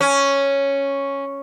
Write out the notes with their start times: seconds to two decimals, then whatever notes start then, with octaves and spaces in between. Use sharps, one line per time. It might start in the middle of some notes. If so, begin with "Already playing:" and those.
0.01 C#4